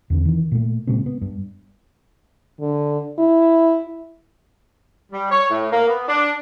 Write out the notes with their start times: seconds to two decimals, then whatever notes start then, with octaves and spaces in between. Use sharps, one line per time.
0.10 E2 D3 C4
0.25 D#3 E3
0.52 A#2 A3
0.87 A#2 C#3 G#3 C4
1.06 B3
1.21 G2
2.60 D3
3.19 E4
5.12 G3
5.31 C#5
5.50 A2
5.72 A#3
5.88 B3
6.09 D4